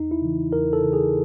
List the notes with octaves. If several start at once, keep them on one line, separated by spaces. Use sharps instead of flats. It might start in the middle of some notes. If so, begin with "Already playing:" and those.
Already playing: E2 D#4
E4
C#3 E3
E2 A#4
A4
C#3 E3
G#4